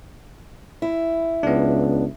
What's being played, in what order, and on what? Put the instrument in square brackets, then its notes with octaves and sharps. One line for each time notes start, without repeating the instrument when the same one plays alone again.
[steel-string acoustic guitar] E4
[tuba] C#2 [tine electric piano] B3 D4